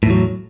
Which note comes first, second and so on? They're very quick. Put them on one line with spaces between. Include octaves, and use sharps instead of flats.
A2 E2 F#3